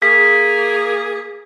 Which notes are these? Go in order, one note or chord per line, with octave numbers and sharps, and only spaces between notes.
A#3 G#4 B6